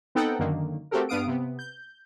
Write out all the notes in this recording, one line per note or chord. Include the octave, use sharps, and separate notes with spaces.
B3 C4 D#4 A4 F#5 G5
F#2 D3 D#3 A#3
A3 C4 F#4 G4 A4 A#4
G2 B3 F5 D#6 D7
C3 B3
G6